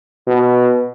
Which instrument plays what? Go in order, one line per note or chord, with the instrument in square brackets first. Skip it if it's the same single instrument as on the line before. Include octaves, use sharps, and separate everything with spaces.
[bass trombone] B2